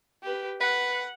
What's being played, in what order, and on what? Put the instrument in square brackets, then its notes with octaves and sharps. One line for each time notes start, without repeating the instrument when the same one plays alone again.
[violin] G4 B4
[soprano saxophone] B4 [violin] F#5